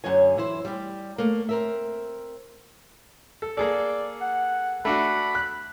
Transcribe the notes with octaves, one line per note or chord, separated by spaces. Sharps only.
F#2 D3 F#3 C#5 G#5
E3 E4 C5
G3 G4
A3 A#3
C4 A#4 E5
A4
A#3 G#4 A4 D5
F#5
A3 D4 F#4 B5
F#6